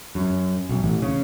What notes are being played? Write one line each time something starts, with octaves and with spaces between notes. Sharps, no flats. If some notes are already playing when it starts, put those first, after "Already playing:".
F#2
B1
A1
C#3